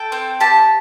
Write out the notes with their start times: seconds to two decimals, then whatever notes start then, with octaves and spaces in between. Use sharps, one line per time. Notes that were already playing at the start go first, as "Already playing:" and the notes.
Already playing: A4 G5
0.12 C4
0.40 G4 A5